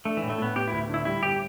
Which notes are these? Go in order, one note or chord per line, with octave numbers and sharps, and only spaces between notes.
A3 D4
E3
A2
A3
A2 B3
B3 G4
D2 E4
D3
E4
G3 E4
G1 G4